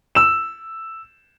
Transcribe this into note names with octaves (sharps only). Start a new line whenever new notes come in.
E6 E7